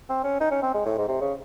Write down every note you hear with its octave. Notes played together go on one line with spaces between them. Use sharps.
C4
C#4
D#4
C#4
C4
G#3
A2
G#2
C3
C#3